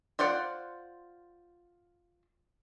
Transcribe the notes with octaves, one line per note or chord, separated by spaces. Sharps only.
F4 C5 D5 F#5